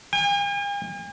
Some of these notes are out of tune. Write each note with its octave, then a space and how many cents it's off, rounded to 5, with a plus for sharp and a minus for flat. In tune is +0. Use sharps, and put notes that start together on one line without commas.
G#5 -45